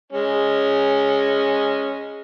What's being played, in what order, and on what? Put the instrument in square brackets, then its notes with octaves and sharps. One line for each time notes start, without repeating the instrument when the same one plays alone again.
[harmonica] G#3 C#4